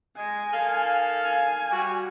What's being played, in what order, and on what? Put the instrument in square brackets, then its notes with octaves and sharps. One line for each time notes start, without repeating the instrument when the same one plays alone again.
[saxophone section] G#3 [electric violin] G#5
[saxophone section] D#3 A4 F5
[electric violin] G#5
[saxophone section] G3 F#4